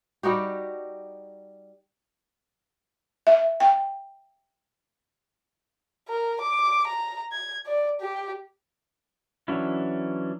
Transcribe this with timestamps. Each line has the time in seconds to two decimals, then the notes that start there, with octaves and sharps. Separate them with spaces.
0.23 G3 D#4 F#4 G4
3.27 E5
3.60 G5
6.09 A#4
6.41 D6
6.87 A#5
7.32 G#6
7.66 D5
8.01 G4
9.48 E3 F#3 C#4 D4 E4